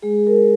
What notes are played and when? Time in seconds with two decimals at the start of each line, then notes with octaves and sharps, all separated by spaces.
0.02 G#3 G#4
0.27 A#4